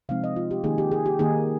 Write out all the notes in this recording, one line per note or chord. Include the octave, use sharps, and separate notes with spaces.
C3 F3 G#3 C4 D#4 F5
D#5
F4
G4
D#3 A#3 D#4 G#4
G4
G#4
G4
D#3 A#3 D#4 G#4